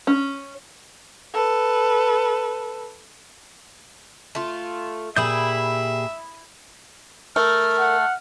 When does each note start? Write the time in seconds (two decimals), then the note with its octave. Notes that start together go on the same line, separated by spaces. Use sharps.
0.07 C#4
1.33 A4 B4
4.35 A3 F4
5.16 A#2 E4 G4 G#4 E5 B5 D#6 G6
7.36 A3 A#4 F6
7.79 F#5